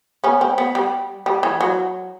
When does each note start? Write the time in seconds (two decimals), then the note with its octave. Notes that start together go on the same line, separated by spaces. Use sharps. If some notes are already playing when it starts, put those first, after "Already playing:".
0.24 B3 C#4
0.41 C4
0.58 B3
0.75 G3
1.26 G3
1.43 E3
1.61 F#3